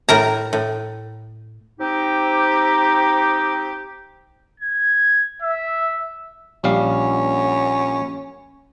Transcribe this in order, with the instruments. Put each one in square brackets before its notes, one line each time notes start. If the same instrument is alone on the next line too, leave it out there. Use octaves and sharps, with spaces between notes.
[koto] A2 A#4 A#5
A2
[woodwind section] C4 D#4 G4
[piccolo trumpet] G#6
E5
[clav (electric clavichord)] A#1 G3 F5 [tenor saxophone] C#4